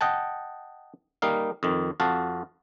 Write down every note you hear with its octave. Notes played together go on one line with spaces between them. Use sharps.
D#5 F#5 G5 A5
G3 A#3 D#4 F5
F2 D#3
F2 F#4 F5 A5